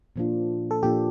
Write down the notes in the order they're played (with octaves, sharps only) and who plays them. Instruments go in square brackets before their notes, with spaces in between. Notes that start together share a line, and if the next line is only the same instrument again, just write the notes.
[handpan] A#2 F3 A#3 D4 F4
[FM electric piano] A4
[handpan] A#2 F3 A#3 D4 F4 [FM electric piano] G4